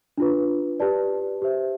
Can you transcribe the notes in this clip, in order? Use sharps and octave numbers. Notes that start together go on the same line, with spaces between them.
D4 F4 B4
G4 B4 D5 A5
G4 C5 E5